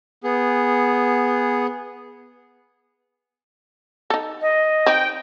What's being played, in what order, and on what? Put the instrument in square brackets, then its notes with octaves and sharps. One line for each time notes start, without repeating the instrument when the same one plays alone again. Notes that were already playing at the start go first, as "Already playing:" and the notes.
[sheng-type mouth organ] B3 G#4
[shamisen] D#4 A4
[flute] D#5
[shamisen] C4 D#4 [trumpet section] G5